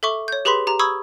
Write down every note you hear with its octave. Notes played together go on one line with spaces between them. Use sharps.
A4 E5 C#6 D6
C#5 G6
G4 G#4 B4 B5 C6 B6
G4 A#5
B5 C#6 D#6 E6 G#6